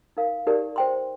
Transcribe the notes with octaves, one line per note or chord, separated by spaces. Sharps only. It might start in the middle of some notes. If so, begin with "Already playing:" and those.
D#4 A#4 F5
D#4 G4 A#4 D5
C5 G5 C6